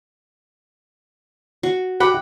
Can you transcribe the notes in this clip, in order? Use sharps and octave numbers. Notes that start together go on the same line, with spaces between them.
F#4
F#4 F#5 G5 B5 D6